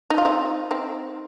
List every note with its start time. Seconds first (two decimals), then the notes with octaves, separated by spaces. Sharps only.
0.10 D#4
0.18 F4
0.25 C4 D#4
0.71 C4 D#4